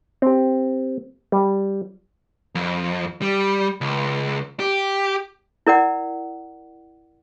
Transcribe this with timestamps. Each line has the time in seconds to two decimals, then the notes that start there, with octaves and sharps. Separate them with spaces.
0.22 C4 G4
1.32 G3
2.55 F2
3.22 G3
3.81 C#2
4.60 G4
5.67 E4 A#4 D5 F#5